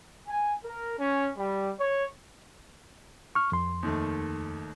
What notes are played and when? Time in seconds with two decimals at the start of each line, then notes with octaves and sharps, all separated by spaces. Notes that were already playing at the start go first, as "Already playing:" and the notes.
0.28 G#5
0.64 A#4
0.98 C#4
1.37 G3
1.80 C#5
3.35 C#6 F6
3.52 F2 C6
3.83 D#2 D#3 A3